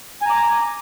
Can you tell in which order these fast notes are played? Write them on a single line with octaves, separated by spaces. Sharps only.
G#5 A#5 D6